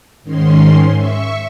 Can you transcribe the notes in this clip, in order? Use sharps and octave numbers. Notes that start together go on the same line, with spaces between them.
G#2 D#3 G#3 C#4 C6
E5 C#6